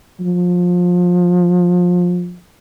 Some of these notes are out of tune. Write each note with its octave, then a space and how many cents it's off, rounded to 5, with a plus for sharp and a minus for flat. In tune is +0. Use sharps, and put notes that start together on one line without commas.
F3 +25